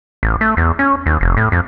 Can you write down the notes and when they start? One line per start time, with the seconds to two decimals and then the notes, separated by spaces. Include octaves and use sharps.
0.23 A1
0.41 A3
0.57 E2
0.79 C#4
1.06 D#2
1.21 F1
1.37 A2
1.52 F2